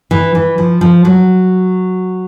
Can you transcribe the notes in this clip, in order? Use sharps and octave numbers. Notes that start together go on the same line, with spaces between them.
E3
E3
F3
F3
F#3